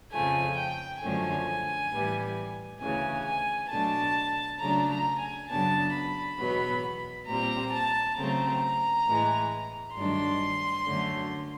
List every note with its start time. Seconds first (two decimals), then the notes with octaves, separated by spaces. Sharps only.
0.12 F2 C#3 F3 A3 G#5
0.57 G5
1.02 F#2 D3 F3 A3 C#4 G#5
1.91 A2 E3 G3 B3
2.81 D2 C#3 E3 G#5
3.26 G#5
3.70 B2 F#3 A3 D4 A5
4.60 C#3 F#3 A3 D4 A#5
4.89 A#5
5.19 G#5
5.49 F#2 C#3 F#3 B3 D4 A5
5.94 B5
6.39 E2 B2 F#3 B3
7.28 A#2 G3 C4 A#5
7.73 A5
8.17 C#3 F#3 A3 C4 A#5
9.06 A2 E3 G#3
9.96 G2 D#3 F#3 A3 D4 C6
10.86 F#2 D3 F#3 A3 C#4